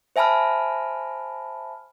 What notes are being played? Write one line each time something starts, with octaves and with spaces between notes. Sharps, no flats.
C5 E5 G#5 A5 B5 F6